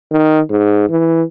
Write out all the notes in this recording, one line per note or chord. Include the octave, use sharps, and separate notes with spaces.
D#3
G#2
E3